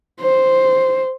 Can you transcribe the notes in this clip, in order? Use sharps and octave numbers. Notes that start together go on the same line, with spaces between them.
C5